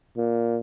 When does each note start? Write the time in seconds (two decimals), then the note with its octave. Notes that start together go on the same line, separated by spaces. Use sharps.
0.17 A#2